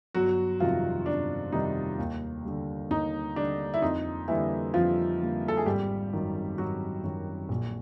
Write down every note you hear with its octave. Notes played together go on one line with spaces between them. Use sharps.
G1 F#3 F#4
F2 C3 D#3 F3 G3 F4
G1 D4
F2 C3 D#3 G3 D#4
D#2
D3 G3
D#2 D#4
D3 G3 D4
E4
F2 D#4
D3 E3 G3 A#3 E4
F2 F3 F4
D3 G3 A#3
A4
G#4
G#1 G3 G4
F#2 D#3 F#3
G#1 F#3 F#4
F#2 D#3 F#3
A#1